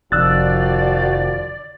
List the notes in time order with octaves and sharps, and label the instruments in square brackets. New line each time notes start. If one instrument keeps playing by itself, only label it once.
[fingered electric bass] F1 [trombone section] D#3 F3 F#4 [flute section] D5 [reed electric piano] E6 F#6 A6